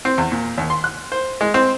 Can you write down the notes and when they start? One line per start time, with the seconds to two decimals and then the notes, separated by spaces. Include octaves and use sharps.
0.05 C4
0.18 E2
0.32 A#2
0.58 D#2
0.70 C6
0.84 F#6
1.12 C5
1.41 G#3
1.54 C4